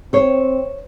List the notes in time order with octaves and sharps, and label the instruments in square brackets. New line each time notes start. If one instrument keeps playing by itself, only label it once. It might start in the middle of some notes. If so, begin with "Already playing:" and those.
[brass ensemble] C4 [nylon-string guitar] C5 C#5